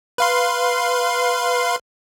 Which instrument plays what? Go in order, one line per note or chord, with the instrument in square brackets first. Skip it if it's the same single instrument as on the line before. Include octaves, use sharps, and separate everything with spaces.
[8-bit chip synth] B4 F5 C6